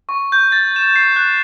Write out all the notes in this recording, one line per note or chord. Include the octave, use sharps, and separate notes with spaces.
C#6
G6
A6
E7
C7
F#6